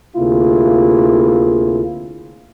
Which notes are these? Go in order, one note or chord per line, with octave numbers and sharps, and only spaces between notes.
D2 C3 A#3 E4 F4 G#4